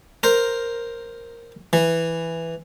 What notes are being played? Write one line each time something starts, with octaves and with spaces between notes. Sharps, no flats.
A#4 C5
E3